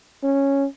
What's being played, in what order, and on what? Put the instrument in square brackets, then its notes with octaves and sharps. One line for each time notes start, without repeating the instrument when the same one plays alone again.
[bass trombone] C#4